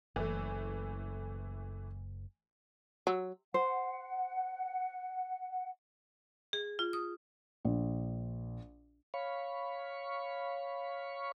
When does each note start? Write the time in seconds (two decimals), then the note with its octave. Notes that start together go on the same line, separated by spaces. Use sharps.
0.16 F#1 E3 A3
3.07 F#3
3.54 C5 F#5
6.53 G#4
6.79 F4
6.93 D#6
7.65 A#1
9.14 C#5 F5 B5 C#6